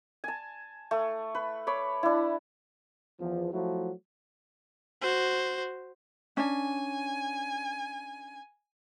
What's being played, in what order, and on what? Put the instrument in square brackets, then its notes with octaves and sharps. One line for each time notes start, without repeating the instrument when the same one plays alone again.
[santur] G#5 A5
A3
B4
C#5 B5 D6
D4 E4
[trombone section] E2 F3
F3 F#3 A3 E4 F#4
[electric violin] F#4 C5
[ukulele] C#4 D4 [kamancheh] G#5